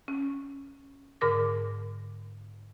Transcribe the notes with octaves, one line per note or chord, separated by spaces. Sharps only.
C#4
G#2 D3 A#4 D6 A#6